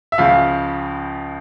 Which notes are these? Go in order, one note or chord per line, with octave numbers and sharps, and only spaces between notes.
E5
C#2 C#3 F3 F5